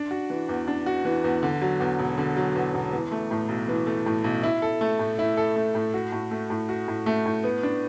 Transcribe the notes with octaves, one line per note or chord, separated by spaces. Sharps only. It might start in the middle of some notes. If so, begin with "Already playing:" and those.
Already playing: D4
F#4
E3
E2
D4
F#4
E3
E2
D3
F#3
E2
E1
D3
F#3
E2
E1
E3
A3
A2
B1
E3
A3
A2
B1
E4
A4
A3
A2
E4
A4
A3
A2
F#4
A2
A3
A2
F#4
A2
A3
A2
B3
D4